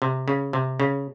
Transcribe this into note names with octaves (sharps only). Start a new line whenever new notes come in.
C3
C#3
C3
C#3